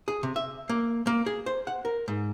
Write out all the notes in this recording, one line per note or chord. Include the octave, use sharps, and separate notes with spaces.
G#4
C3
E5
A#3
A#3
G#4
C5
F#5
A#4
G#2